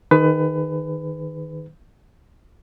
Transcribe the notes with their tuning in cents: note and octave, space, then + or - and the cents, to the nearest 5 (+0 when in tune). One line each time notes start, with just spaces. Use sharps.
D#3 +0 G#4 +0 B4 +25